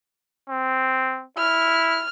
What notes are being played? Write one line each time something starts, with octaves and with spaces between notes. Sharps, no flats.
C4
E4 F6